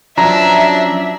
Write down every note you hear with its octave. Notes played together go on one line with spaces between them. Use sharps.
F3 F#3 C#4 D4 E5 A#5